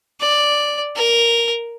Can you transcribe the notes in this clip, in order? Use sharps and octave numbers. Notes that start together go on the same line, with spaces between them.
D5
A#4